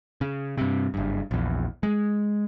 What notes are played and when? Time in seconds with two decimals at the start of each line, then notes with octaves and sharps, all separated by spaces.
0.21 C#3
0.58 G2 C3
0.94 F#1 G2
1.31 A#1 E2
1.83 G#3